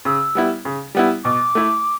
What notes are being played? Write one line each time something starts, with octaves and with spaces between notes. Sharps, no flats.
C#3 E6
G3 B3 E4
C#3
G3 B3 E4
B2 D6
A3 E4